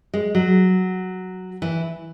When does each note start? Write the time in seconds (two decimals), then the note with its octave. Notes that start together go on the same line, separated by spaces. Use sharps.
0.14 G#3
0.35 F#3
1.62 E3